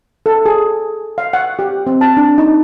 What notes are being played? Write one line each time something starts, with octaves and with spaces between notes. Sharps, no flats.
A4
G#4
F5
F#5
G4
C4
A5
D4
D#4